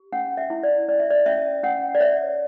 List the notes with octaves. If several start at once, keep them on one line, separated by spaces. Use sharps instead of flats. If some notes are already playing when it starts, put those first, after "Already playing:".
Already playing: G4
C#4 F#5
E5
E4
D5
C#4 D5
E5
D5
C#4 E5
C#4 F#5
D5
C#5 E5